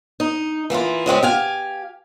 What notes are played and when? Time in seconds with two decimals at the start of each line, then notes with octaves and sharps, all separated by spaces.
0.20 D#4
0.70 E3 A#3 E4 F4
1.06 C#3 G#3 C4 C#4
1.23 G4 F5 G#5